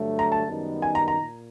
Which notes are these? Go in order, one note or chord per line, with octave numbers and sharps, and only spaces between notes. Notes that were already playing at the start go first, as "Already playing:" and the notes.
Already playing: G2 D3 F#3 A3
A#5
A5
F#2 D#3 G3 B3 D#4
G#5
A#5
A#5
A#2